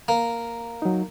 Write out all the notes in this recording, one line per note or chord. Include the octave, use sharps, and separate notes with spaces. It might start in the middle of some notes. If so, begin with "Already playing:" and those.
A#3
F#3 D#4